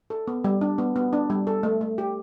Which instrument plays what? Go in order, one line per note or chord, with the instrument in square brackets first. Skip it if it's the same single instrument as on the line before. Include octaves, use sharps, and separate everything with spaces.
[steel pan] A4
B3
G3
D4
B3
B3
D4
G3
A4
A3
A3
G4